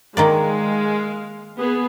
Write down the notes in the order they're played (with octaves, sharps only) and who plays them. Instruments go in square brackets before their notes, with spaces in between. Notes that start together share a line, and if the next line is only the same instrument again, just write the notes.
[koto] D#3 A#3 D5 [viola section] G#3 F5
[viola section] B3 G#4